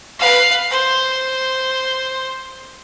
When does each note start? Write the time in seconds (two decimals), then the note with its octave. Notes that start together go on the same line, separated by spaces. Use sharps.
0.19 B4 F5
0.70 C5